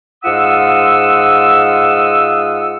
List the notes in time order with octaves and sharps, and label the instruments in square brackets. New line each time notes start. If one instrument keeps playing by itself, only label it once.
[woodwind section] G#2 F4 F#5 D#6 E6